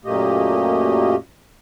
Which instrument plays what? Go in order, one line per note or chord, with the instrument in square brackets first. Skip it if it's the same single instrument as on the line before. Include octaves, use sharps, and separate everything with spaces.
[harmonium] F#2 A#2 A3 A#3 G4 D#5